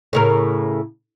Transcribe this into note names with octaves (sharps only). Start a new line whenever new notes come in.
A2 C#3 A#4